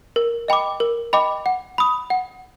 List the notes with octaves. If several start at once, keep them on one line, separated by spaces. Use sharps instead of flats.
A#4
D#5 G5 B5 D6
A#4
D#5 G5 B5 D6
F#5
B5 D#6
F#5